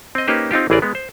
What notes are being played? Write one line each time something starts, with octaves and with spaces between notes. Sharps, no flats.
C4 D#5
A#3 C#4 D#4 G4 B4 C5
C4 D#4 F4 G4
A1 E3 G#4 A#4 D5
G#3 B3
C5